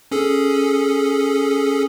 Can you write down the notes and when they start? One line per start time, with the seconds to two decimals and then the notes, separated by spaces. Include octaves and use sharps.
0.11 C#4 G#4 A4